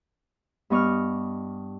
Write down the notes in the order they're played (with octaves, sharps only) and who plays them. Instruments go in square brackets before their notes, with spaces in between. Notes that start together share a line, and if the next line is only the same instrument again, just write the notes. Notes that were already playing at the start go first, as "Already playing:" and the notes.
[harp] G2 B3 D#5 C#6 D6 F6